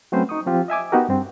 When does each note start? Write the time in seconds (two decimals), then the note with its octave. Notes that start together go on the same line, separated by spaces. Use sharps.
0.12 F#3 A3 C4 C#4 B4 C5
0.29 D#4 C#6 D#6
0.46 F3 C4 F4 G4
0.68 D#5 E5 G#5 D6
0.92 B3 D#4 F#4 G4 A#4
1.09 G2 C4